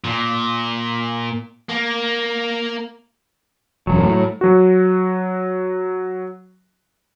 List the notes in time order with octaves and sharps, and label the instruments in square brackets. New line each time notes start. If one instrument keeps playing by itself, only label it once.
[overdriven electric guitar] A#2
A#3
[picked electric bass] E1 F#2 [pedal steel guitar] F#3
[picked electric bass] A2
[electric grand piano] F#3 F#4